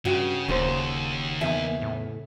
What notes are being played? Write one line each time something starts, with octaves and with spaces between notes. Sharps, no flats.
G2 C#3 F#4 G5
D#1 D#2 C#3 C5
E2 D#3 E5 G#5
A2